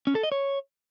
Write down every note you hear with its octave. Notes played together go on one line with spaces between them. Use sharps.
C#4
A4
D#5
C#5